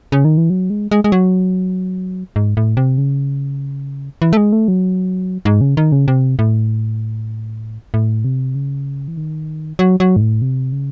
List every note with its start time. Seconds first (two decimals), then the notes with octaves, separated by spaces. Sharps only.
0.12 C#3
0.25 D#3
0.37 E3
0.50 F#3
0.70 G#3
0.91 G#3
1.04 G#3
1.12 F#3
2.36 G#2
2.57 A2
2.77 C3
2.98 C#3
4.22 E3
4.33 A3
4.37 G#3
4.53 A3
4.68 F#3
5.45 G#2
5.61 C#3
5.77 D#3
5.92 C#3
6.08 C3
6.39 A2
7.94 A2
8.25 C3
8.55 C#3
9.08 E3
9.17 D#3
9.79 F#3
10.00 F#3
10.16 G#2
10.21 A2
10.42 C3
10.72 C#3